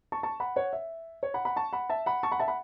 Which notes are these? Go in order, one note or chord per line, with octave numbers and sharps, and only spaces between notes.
A5 C#6
A5 C#6
F#5 B5
C#5 F#5
E5
C#5
F#5 B5
F#5 B5
A5 C#6
F#5 B5
E5 A5
F#5 B5
A5 C#6
F#5 B5
E5 A5
F#5 B5